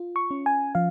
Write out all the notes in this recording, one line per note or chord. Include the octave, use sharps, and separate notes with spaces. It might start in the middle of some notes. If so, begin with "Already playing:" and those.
Already playing: F4
C#6
C#4
G#5
F3 F5